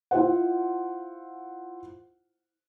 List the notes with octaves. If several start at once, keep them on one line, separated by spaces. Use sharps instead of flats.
E4 F4 C5 F#5